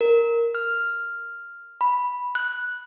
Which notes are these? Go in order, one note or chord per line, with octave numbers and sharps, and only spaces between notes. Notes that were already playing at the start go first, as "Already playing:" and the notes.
A#4
F6
B5
F#6